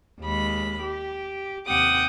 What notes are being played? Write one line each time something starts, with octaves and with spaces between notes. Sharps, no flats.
D#2 G#3 B5
G4
D#2 C3 F#5 G5 D6 D#6